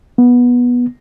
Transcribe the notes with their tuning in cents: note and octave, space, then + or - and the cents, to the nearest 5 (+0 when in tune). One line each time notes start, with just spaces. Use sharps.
B3 -15